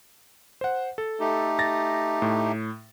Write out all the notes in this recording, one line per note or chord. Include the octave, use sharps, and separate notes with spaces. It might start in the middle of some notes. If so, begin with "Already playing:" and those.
C5 F#5
A4
A3 D#4 G4
A6 A#6
A2